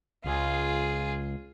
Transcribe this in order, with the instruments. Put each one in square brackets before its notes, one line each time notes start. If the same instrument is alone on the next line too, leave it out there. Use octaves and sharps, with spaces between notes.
[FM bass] C#2 [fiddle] F4 G#4